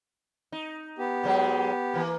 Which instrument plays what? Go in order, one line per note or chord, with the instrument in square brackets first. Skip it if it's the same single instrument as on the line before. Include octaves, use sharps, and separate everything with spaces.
[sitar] D#4
[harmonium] B3 G4
[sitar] G#2 F#3 G#3
E3 A#3